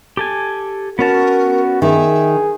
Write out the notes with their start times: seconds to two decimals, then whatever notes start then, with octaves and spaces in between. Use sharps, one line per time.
0.17 G4 A4 G#5
0.99 B3 C#4 F#4 A#4 A5
1.82 D#3 G#4 E5